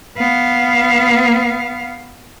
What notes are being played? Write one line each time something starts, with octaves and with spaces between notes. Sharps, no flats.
B3 F5